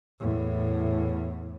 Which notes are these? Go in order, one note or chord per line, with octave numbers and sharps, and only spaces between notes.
E2 A2